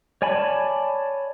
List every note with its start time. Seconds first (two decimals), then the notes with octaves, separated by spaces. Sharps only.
0.22 C#5 D5 G#5 A5 B5